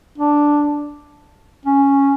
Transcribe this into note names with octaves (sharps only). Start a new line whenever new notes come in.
D4
C#4